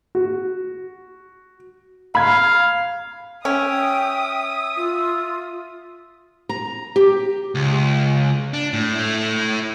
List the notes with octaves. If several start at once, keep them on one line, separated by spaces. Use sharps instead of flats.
F#4
F5 B5 G#6
C#4 E5 G5 D#6
F4
A#5
G4
C#2
D4
A2
A3 E4